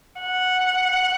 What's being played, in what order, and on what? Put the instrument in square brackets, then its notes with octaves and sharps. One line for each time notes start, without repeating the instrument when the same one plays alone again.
[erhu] F#5